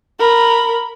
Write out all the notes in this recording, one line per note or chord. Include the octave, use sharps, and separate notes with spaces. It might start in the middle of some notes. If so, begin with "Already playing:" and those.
A#4 B5